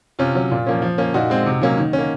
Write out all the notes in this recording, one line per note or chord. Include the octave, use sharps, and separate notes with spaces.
C3 C#4 F4
F#3 C#4
A#2
F3 A#3 C#4
F3
A#3 C#4
A#2 D#4 F#4
G#3 C4
C3
F#3 A#3 C#4
D#3
C#4
A#3